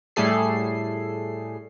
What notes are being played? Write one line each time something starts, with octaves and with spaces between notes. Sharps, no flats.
A2 G3 A3 G#4 A4 C7